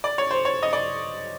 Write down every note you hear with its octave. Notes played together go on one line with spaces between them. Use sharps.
D5
C#5
C5
C#5
D#5
D5